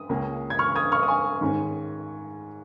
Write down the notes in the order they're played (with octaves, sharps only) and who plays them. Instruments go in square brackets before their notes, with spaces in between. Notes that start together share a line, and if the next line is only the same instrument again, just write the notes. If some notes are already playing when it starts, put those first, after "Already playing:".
Already playing: [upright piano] D#6
C#2 C#3 A#3 C#4
G#6
C#6 F6
D#6 G#6
C#6 F6
D#6
G#5 C#6
G#2 D#3 G#3 C#4